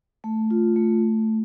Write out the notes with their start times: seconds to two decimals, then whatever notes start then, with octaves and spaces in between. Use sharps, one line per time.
0.24 A3
0.51 F4
0.76 A3